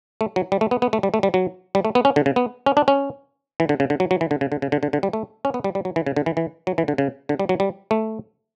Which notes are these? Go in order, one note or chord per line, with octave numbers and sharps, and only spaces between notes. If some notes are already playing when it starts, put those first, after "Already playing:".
A3
F#3
G3
A3
B3
B3
A3
G3
A3
G3
F#3
G3
A3
B3
C#4
D3
C#3
B3
C#4
D4
C#4
E3
D3
C#3
D3
F#3
F#3
E3
D3
C#3
D3
C#3
D3
D3
D3
G3
A3
C#4
B3
G3
G3
F#3
E3
C#3
D3
E3
E3
F#3
E3
D3
C#3
D3
G3
F#3
G3
A3